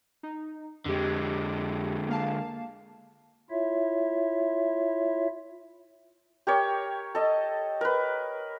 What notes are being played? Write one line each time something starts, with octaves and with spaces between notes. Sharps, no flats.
D#4
F2 D3 G#3 G4
A#3 F5 A5
E4 F4 C#5 E5
G4 A#4 C#5
A4 D#5
A#4 B4